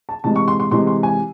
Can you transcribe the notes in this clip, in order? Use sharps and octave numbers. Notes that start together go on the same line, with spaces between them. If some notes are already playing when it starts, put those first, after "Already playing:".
A5
C3 E3 G#3 A5
C#6
C6
C6
C3 E3 G#3 C6
C6
G#5